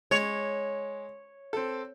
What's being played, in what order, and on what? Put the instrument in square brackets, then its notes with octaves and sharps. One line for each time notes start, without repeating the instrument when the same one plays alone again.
[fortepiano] G#3 [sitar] C#5
[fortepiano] C4 A4